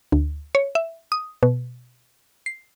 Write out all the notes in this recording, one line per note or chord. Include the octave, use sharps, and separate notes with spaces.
D2
C#5
E5
D#6
B2
C7